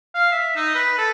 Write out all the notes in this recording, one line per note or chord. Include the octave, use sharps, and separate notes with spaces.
F5
E5
D#4
B4
A4